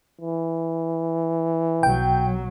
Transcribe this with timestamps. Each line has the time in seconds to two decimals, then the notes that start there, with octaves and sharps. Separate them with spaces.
0.21 E3
1.83 B1 F#3 G5